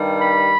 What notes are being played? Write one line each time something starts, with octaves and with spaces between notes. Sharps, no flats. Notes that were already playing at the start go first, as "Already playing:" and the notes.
Already playing: G2 D#3 G3
B5